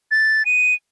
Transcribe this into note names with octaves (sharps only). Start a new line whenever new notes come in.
A6
D#7